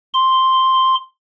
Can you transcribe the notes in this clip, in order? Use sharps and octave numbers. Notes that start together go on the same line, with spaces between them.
C6